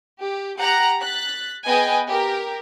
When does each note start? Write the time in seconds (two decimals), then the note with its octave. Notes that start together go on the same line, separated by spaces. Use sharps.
0.19 G4
0.58 G4 F#5 A#5
1.01 F#6 A6 B6
1.65 B3 G#4 B4 D#5 G5 G#5
2.08 G4 A#4